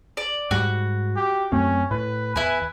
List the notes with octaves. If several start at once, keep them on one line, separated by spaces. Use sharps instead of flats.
D5
G#2 G3 F#4
G4
F#2 A3 C4 C#4
A2 B4
E2 E4 B4 G#5